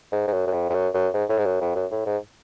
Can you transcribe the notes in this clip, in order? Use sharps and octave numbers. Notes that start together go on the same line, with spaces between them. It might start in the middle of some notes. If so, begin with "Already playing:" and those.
G#2
G#2
F#2
F#2
F2
F2
F#2
F#2
G#2
A2
G#2
F#2
F2
F#2
A2
G#2